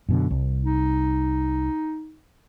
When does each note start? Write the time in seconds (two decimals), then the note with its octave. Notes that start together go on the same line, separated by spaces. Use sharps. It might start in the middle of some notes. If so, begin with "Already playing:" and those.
0.09 F#2 B2 D3
0.31 C2
0.64 D#4